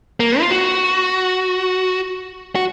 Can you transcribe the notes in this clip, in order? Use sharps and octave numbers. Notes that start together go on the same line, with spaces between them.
A#3
F4
F#4
F#4